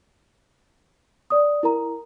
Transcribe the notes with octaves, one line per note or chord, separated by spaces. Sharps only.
D5 D#6
E4 A#4 A#5